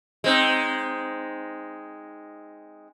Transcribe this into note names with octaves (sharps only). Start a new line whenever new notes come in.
G#3 C4 D#4